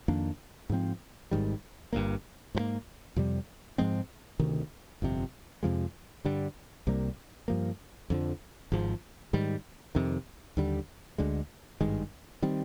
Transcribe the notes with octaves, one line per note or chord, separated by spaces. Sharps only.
F2 D#3 A#3 D4
G#2 F3 C4
G#1 G#2 D#3 G3
G1 G2 D#3 A#3
G#2 F3 A#3
F2 C3 G3
G#2 F3 G#3 C4
D2 C3 D#3
G1 F2 C3
F2 C3 F3 G#3
G2 D3 G3
C2 C3 G3 A#3
G2 F3 A#3
F2 D3 F3
G#1 G#2 F3
G#2 D#3 G3
F2 C3 D#3
D#2 D3 G3
D2 D3 G#3
G#1 G2 D#3 G#3
D#3 G3 C4